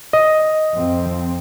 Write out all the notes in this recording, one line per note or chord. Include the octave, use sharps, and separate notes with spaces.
D#5
F2 F3 C4